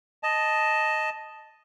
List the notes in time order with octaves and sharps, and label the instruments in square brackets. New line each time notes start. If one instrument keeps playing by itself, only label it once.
[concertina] D#5 A5